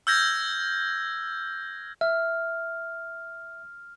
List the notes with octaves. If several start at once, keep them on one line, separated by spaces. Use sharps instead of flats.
E6 F6 G6 G#6 A#6
E5 F6